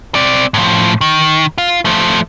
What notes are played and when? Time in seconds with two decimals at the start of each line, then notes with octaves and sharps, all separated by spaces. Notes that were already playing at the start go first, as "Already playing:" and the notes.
0.15 C4 D5
0.54 A2 F3
1.01 D#3
1.58 F4
1.85 F3 A3